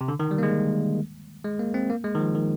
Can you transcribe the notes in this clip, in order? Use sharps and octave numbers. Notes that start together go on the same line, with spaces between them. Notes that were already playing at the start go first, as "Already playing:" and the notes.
C3
D3
D#3
G3
A#3
G#3
G#3
A#3
C4
A#3
G#3
D#3
F3
D#3